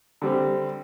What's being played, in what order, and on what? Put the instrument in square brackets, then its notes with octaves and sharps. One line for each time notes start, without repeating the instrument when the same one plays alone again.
[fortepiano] D3 G3 C4